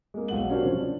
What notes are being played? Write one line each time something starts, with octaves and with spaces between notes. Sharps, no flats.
G#3 A#3
B1 F5 F#5 F#7
C#4 D4 F#4 G4 A#4 C5
C#3 F3 C#4
D4